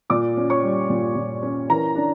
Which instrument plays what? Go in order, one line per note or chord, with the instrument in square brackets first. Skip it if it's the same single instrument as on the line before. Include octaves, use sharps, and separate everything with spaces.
[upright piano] A#2 D5 D6
C#4
C#5 C#6
G3
A#2
A#2
C#4
E3 A#4 A#5
D4